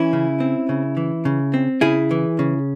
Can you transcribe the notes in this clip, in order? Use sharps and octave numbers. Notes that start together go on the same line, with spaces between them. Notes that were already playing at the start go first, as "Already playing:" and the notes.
Already playing: E3 C#4 E4
C#3
C4
C#3
E3
C#3
C4
C#3 E4 G#4
E3
C#3